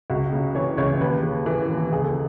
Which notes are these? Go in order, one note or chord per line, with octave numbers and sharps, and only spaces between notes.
C#2 F#4
C#3
E3 C#5
C#2 C#5
D#2 B4
C#3
E3
D#2
C#2 G#4
A4